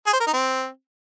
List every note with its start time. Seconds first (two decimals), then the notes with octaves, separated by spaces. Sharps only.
0.07 G#4
0.13 C5
0.20 A#4
0.27 D#4
0.34 C4